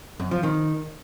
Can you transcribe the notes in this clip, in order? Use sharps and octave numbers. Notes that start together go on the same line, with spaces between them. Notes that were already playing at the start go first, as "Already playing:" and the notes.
F#2
F3
D#3